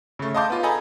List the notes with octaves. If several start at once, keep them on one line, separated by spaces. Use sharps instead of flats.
C#3 A3
D#5 F5 A5 C6 D6 G6
B3 F4
G#4 A4 D#5 G#5 A#5 B5